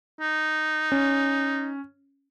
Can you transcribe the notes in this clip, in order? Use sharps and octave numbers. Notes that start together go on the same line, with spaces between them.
D#4
C#4